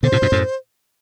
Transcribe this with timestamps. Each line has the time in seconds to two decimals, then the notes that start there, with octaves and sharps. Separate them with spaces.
0.03 B2 D3 C5
0.12 A2 C3
0.22 G2 B2
0.32 F#2 A2